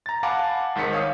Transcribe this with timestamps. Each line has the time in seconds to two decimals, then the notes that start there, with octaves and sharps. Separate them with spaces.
0.06 A#5 A6
0.23 F5 F#5 G#5 A5 B5 D6
0.75 G#1 G#2 D#3 B6 C#7
0.93 C#5 F5 D#6